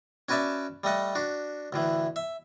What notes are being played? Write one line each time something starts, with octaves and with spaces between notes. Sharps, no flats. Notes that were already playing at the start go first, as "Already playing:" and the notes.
C#4 F#4 B4 D5 E5 A5
G3 A3 D#5 F#5
D4 F#4
D2 A2 E3
E5